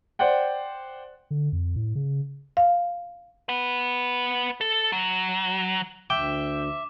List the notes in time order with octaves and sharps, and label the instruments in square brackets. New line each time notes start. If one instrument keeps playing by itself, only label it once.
[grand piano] C5 D5 F#5 G5
[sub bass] D3
F2
A2
C#3
[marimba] F5
[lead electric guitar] B4 F#5
A4
F#3
[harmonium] D2 [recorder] E5 [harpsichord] G5 [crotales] D6